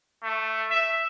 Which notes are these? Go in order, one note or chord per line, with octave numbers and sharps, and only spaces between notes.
A3
E5